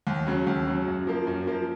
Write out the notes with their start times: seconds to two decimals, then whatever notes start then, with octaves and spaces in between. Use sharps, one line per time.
0.07 D#2
0.27 C#3 F#3
0.47 D#2
0.67 C#3 F#3
0.87 F#2
1.07 F3 A#3
1.27 F#2
1.47 F3 A#3